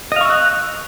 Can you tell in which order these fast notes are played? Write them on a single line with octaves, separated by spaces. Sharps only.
D#5 F5 C#6 E6 F#6